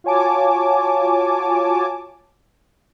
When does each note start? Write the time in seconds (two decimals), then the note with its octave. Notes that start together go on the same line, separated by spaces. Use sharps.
0.04 F4 F#4 C#5 G#5 A5 D6